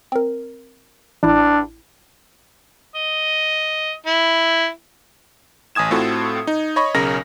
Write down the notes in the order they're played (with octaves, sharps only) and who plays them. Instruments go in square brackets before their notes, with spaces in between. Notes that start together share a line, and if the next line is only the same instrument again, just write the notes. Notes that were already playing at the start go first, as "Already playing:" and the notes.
[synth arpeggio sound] C4 A#4
[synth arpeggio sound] A1 E4 [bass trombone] D4
[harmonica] D#5
E4
[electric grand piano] A1 G#5 D#6 G#6 E7
A2 C4 F4 F#4 A4
D#4
C#5 D#5 B5 C#6
B1 C#3 C#4 A#4 A#6